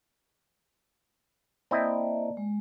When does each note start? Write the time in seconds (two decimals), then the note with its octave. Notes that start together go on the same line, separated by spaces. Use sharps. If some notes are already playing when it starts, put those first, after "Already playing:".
1.71 A#3 C4 E4 D5 D#5 A5
2.37 G#3